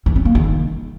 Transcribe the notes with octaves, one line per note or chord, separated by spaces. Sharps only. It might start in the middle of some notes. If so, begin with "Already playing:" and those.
E3
C4
A#3
D#3